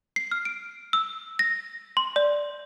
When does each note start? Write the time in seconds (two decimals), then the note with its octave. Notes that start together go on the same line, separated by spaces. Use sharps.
0.16 C7
0.31 F6
0.45 D7
0.93 E6
1.39 A#6
1.97 C6
2.16 D5